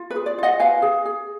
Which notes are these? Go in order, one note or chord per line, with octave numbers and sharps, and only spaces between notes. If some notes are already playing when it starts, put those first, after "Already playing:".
Already playing: F4
B4
G#4
D5
F4 D#5 F#5
B4 F5 G#5
G#4
G#4